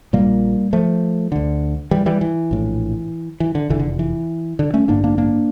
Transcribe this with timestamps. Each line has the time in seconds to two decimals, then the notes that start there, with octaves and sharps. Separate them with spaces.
0.13 A#1 A#2 G3 A#3
0.73 F3 A3
1.32 D2 D3
1.91 E3 G3
2.06 E3 G3
2.21 E3
2.51 A#1 A2
3.40 E3
3.55 D3
3.69 F1 E2 D3 E3
3.80 D3
3.99 E3
4.59 D3
4.74 A3 C#4
4.88 A1 G2 D3 A#3 D4
5.04 A#3 D4
5.18 A#3 D4